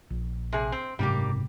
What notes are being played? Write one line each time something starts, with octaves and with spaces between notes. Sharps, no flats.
A#1
C3 G#4
C4
F#1 G#2 C3 G3 A#3 G4